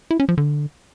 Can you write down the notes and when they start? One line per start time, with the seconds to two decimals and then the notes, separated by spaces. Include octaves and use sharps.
0.11 E4
0.20 C#4
0.29 F3
0.38 D3